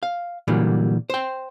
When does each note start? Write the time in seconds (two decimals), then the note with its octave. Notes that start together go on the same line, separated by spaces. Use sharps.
0.03 F5
0.48 A#2 D3 E3 F#3 G3 A#3
1.10 C5 G5